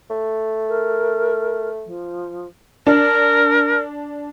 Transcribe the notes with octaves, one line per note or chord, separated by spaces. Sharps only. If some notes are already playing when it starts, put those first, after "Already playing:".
A3
A#4
F3
D4 A#4